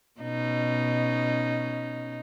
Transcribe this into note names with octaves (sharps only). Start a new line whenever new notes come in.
B2 C#4 D#4